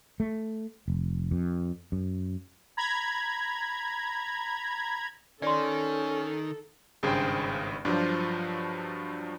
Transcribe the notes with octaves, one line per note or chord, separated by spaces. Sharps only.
A3
F1
F2
F#2
A#5 B5 G#6
D#3 C#4 A4 D5 C6
G#1 G2 C#3 G#4 C5 G5
G2 F3 F#3 D4 F4 C5